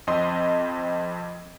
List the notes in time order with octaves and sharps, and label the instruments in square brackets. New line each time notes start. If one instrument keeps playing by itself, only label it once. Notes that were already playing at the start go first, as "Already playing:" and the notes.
[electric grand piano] F2 C4 D#5 C6